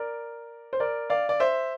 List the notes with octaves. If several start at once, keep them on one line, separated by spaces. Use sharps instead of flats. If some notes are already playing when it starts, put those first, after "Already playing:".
Already playing: A#4 D5
C5
A#4 D5
D5 F5
D5
C5 E5